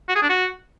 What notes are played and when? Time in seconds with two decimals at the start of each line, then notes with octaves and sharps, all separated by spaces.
0.09 F#4
0.16 G#4
0.23 D4
0.30 F#4